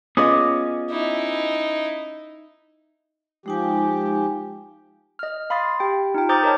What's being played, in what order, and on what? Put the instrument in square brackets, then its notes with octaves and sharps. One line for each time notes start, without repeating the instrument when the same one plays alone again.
[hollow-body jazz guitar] B3 C#4 [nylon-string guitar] F4 G#4 D#5 [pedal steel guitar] D6 D#6
[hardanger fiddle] D#4 E4
[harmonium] F3 G4 [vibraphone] G#3 D#4 G#5
[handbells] D#5 F6
F5 B5 C6 D#6 A6
G4 G5
D#4 F4 G5
C5 A#5 D6 D#6 G6 A6
A#4 C#5 D#5 A5